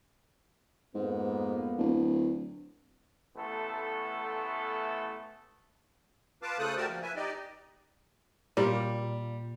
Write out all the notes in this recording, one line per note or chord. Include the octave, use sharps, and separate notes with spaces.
F2 G#2 A#3 B3
D1
A1 A3 B3 A4
F4 B4 F5 A5 D6
C#3 A3 A4 C5 D#6 F#6
A3 F#4 G4 A#4 D5 A5
F3 A#3
B4 E5 G#5
D#4 G4 D5 D#5
A#2 G3